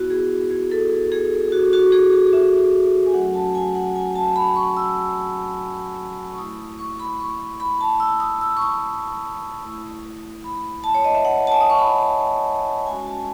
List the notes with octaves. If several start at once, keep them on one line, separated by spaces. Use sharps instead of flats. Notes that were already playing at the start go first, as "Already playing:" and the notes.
Already playing: B3 E4 F#4
G#4
G#4
A4
G#4
F#4
F#4
G#4
F#4
E5
G#5
F#3 A3 C#4 F#4 F#5
A5
G#5
F#5
G#5
A5
B5
C#6
E6
C#6
A3 E4 D#6
D#6
C#6
B5
C#6
B5
A5
E6
D#6
E6
C#6
D#6
A3 E4
B5
A5
C#5
D#5
E5
F#5
A5
G#5
D#6
C#6
B5
G#3 C#4 F#4 G#5
A5